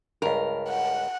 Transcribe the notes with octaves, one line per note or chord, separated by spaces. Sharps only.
C#2 G2 A#4
F#5